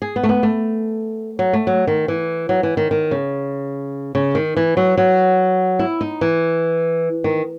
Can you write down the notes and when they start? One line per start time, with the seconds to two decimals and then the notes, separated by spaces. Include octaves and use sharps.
0.02 G#4
0.16 B3
0.23 A3
0.29 B3
0.43 A3
1.39 F#3
1.53 A3
1.67 F#3
1.87 D#3
2.08 E3
2.49 F#3
2.63 E3
2.77 D#3
2.91 D#3
3.11 C#3
4.15 C#3
4.35 D#3
4.57 E3
4.77 F#3
4.98 F#3
5.79 E4
6.01 D#4
6.21 E3
7.24 D#3